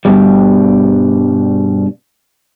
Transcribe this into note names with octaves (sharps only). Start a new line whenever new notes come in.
G2 B2 G3